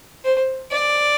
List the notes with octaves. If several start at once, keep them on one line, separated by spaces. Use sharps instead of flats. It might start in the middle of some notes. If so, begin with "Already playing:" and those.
C5
D5